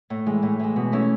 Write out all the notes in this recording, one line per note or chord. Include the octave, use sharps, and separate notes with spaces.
A2
E3 G#3
A2
E3 G#3
B2
A3 C#4 E4